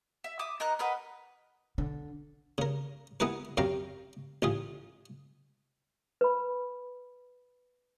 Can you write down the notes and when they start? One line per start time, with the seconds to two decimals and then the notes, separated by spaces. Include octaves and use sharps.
0.24 E5
0.39 E5 D6 D#6
0.60 D#4 A#4 A#5 F#6
0.79 A#4 B4 D#5 F#5
1.78 D3
2.58 C#3 A#4
3.20 B3 E4 G#4 A#4 B4
3.57 F#2 C3 F5 G5 A#5
4.42 A1 F4 G#4
6.21 B4 B5